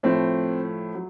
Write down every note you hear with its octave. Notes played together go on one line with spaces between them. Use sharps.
A2 F3 A3 C4
F#3